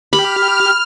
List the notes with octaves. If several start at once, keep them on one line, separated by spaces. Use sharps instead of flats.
G4 B5 F6